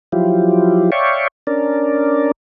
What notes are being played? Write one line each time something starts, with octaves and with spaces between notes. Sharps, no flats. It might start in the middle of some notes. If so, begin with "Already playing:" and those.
F3 F#3 E4 F4 G4
C#5 D5 E5 F5 G5 C#6
C#4 D4 A#4 D5